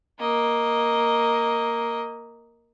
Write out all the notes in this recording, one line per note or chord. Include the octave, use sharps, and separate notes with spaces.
A#3 D#5